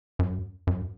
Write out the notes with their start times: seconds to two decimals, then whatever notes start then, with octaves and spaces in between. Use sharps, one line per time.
0.19 F#2
0.67 F#2